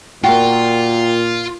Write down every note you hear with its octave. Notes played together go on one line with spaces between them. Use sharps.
A#2 A#3 F4 F#4 G5